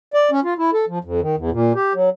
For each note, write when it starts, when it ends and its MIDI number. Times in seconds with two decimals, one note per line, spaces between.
0.14 0.30 74
0.31 0.40 61
0.44 0.54 65
0.58 0.71 64
0.74 0.85 69
0.88 0.99 53
1.04 1.21 41
1.21 1.36 51
1.37 1.50 40
1.51 1.73 46
1.75 1.93 67
1.94 2.10 54